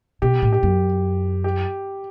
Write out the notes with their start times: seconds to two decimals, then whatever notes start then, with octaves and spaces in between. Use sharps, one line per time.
0.22 B2 G4
0.42 A2
0.53 G4
0.63 F#2
1.44 G4